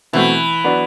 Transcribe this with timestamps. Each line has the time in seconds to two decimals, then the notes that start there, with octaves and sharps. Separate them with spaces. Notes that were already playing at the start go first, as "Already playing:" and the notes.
0.13 B2 E3 F#3 A3 C4 F#4
0.64 F#3 B3 D4